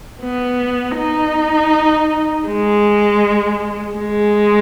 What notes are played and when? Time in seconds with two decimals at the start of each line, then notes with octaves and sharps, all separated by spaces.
0.22 B3
0.97 D#4
2.47 G#3
3.98 G#3